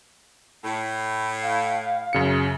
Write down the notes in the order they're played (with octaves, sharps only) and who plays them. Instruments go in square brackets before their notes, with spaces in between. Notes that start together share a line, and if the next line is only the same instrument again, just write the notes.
[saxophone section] A2
[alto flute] F5
[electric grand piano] F#2 C#3 C#7